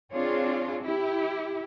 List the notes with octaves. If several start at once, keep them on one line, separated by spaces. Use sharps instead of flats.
C4 D4 F4 G#4 C#5
E4 G4